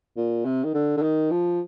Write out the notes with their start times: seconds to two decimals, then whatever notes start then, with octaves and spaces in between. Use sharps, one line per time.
0.17 A#2
0.45 C3
0.64 D#3
0.74 D3
0.97 D3
1.02 D#3
1.31 F3